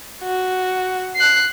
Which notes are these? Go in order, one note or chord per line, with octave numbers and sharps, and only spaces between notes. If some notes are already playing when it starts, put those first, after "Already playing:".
F#4
F#6 C7